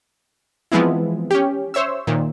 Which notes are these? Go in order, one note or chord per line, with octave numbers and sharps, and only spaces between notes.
E3 F3 G#3 B3 C4 E4
C#4 G4
C5 C#5 E5 E6
A#2 D#3